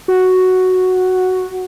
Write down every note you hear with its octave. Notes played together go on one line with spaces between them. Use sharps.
F#4